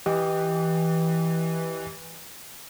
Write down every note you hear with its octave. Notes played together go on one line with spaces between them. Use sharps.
E3 G4 D#5 G5